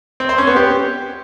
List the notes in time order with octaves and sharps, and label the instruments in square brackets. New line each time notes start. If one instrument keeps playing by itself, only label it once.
[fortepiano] C4
C5
C#4
B3
G4